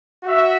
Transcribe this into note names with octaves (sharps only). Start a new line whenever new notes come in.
F#4 E5